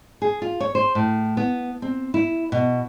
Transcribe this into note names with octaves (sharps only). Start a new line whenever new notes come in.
G#4
F4
C#5
C5
A2
B3
C4
E4
B2